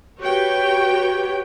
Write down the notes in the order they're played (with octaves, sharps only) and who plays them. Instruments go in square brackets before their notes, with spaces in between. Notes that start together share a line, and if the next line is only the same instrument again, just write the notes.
[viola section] F#4 G4 B4 C#5 G5